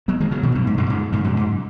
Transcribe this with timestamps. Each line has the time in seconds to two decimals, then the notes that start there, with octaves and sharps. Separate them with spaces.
0.08 F#3 B3
0.20 D#3 G#3
0.31 C#3 F#3
0.43 B2 D#3
0.55 F#2 B2
0.67 G#2
0.78 F#2 B2
0.90 G#2 C#3
1.12 G#2 C#3
1.24 F#2 B2
1.37 G#2